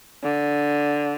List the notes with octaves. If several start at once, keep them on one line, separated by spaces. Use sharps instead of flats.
D3